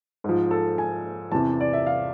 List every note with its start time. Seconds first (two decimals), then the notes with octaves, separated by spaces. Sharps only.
0.24 G#2 F3
0.51 A4
0.78 G#5
1.32 E2 C3 E3 A5
1.60 D5
1.73 E5
1.86 F5